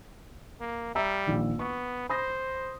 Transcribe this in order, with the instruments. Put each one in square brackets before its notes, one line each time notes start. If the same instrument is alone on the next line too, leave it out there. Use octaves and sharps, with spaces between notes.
[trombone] A#3
[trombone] G3 [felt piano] E5 A#5 E6
[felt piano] A#1 D#3
[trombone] B3 [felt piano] C#6
[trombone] C5 [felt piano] B5 D#6 A#6